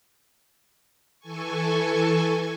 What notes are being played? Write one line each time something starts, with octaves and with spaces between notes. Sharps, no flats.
E3 A4 G#5 C#6